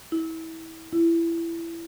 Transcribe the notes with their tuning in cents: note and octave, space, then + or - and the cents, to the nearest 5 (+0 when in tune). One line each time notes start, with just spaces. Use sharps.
E4 -25
E4 +20